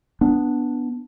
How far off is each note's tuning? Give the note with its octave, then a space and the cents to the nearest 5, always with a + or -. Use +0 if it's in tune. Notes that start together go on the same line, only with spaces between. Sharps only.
B3 +0 D4 +0